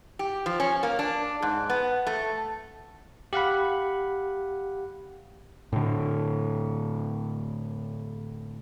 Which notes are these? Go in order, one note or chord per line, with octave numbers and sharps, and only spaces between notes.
G4
F3
C#4
A#3
D4
G#2
B3
A3
G4 F5 F#5 B5
A2 D3